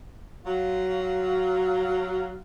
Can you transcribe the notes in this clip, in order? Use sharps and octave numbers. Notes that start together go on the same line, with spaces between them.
F#3 F4